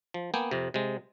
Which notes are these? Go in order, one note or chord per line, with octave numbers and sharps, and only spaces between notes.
F3
A#3 B3 G5 G#5
F2 C3
C3 G#3